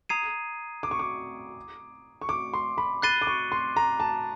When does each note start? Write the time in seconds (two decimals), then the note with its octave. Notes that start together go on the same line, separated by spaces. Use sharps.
0.09 A#5 D#6 G#6 C7 D#7
0.83 D6
0.91 C#6
0.99 D6
2.22 C#6
2.29 D6
2.54 C6
2.78 B5
3.02 B5 F#6 A6 C7 D#7 G7
3.22 D6
3.27 C#6
3.52 C6
3.76 A#5
4.00 A5